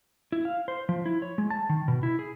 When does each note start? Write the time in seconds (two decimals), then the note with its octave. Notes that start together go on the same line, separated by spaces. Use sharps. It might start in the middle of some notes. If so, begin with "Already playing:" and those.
0.32 E4
0.45 F5
0.68 C5
0.89 F3
1.06 E4
1.22 C#5
1.38 G#3
1.50 A5
1.69 D#3
1.88 B2
2.03 E4
2.19 G#4